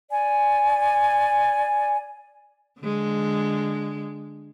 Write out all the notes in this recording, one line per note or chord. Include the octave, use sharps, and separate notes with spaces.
D5 G#5
D3 G#3